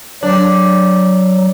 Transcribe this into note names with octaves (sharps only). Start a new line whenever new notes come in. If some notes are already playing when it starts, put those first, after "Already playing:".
F#3 D4